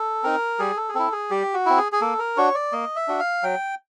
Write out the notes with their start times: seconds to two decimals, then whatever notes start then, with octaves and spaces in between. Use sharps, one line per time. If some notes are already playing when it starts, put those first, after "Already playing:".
Already playing: A4
0.23 C4 D#4 A#4
0.59 G3 G#4
0.77 A4
0.89 G#4
0.95 C4 E4 A4
1.12 G#4
1.30 G3 G4
1.54 F#4
1.66 C4 E4
1.77 G#4
1.92 G#4
2.01 A#3 A4
2.19 A#4
2.37 D4 F#4 C#5
2.55 D5
2.72 A#3 D#5
2.96 E5
3.08 D4 F#4
3.19 F5
3.43 F#3 G5